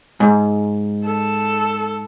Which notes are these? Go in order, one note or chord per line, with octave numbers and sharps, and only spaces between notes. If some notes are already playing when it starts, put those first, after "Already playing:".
G#2
A4